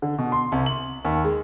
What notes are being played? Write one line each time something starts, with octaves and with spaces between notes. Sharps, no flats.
D3
B2
C6
C2
F#7
D#2
G#3